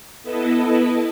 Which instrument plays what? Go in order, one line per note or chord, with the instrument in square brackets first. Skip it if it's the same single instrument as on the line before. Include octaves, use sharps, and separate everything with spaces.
[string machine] B3 E4 A4 B4 D#5 A5